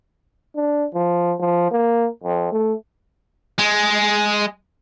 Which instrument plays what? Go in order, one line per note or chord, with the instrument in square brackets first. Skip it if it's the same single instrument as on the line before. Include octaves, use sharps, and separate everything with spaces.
[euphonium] D4
F3
F3
A#3
F2
A3
[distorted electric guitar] G#3